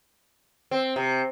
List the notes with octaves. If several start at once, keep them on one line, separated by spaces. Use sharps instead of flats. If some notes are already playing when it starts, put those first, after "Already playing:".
C4
C3